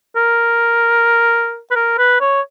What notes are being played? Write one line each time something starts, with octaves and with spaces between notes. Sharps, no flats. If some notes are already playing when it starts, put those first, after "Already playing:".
A#4
B4
A#4
B4
C#5